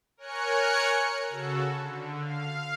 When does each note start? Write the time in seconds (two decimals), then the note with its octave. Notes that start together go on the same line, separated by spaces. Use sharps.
0.17 A#4 C#5 G#5 F#6 C#7
1.30 C#3 F#4 A4
1.76 D3
2.20 F5